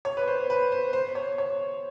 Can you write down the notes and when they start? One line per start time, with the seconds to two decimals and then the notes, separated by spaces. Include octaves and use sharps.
0.05 C#5
0.17 B4
0.28 C5
0.50 B4
0.72 C5
0.93 C5
1.15 C#5
1.38 C#5